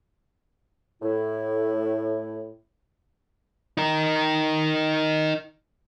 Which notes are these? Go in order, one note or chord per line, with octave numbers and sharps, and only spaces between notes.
A2 E4
D#4 A#4